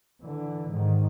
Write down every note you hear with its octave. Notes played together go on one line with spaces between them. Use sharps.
D3 E3
G#2 D#3